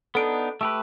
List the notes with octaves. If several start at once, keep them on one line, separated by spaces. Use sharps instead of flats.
B3 D4 D#4 A4 D7
A3 G4 B4 E6